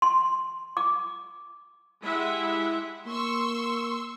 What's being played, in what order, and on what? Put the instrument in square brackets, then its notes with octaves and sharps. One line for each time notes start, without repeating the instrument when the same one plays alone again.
[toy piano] C6
D6
[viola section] G#3 E4 G4 E5 F#5
[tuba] A#3 [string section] C6 C#6 E6